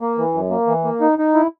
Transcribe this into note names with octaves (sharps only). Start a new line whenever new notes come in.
A#3
E3
F#2
A#3
E3
A#3
D#4
D#4
E4